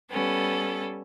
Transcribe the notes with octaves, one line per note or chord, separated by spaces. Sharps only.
G3 B3 C#4 A4